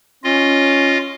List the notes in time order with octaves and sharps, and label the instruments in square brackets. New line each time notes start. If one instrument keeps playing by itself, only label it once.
[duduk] C#4 [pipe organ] F4 D#5